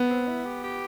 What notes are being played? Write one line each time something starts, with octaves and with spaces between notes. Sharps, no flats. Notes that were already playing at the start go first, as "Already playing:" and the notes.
Already playing: B3
C4
E4
G4
G4